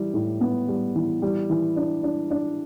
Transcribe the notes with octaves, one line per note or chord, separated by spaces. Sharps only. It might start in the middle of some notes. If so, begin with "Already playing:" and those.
Already playing: E3 G3
A2
B3
G3
E3
G3
E3
D4
D4
D4